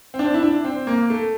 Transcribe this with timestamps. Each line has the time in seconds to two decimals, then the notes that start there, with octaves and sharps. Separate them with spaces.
0.14 C4
0.19 D4
0.34 E4
0.43 D4
0.64 C4
0.87 A#3
1.10 A3